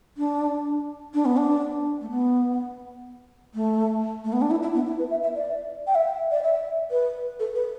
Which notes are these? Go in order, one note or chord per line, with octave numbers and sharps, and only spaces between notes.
D4
D4
B3
D4
A3
B3
A3
A3
B3
D4
E4
E4
B3
E4
B4
E5
E5
D5
G5
E5
D5
E5
B4
A4
B4